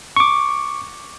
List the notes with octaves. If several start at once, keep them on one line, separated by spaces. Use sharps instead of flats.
C#6 D6